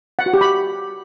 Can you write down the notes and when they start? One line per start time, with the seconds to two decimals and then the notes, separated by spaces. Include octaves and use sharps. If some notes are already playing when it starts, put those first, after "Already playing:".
0.19 F#5
0.26 F#4
0.34 G4
0.41 B5